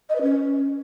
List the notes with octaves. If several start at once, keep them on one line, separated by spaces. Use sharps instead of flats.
D#5
B4
C#4